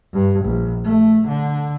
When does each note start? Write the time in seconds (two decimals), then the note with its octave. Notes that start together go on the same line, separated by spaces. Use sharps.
0.13 G2
0.45 A#1
0.85 A3
1.28 D3